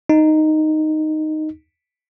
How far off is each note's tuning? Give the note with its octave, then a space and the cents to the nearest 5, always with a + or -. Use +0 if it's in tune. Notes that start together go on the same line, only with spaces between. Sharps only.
D#4 -5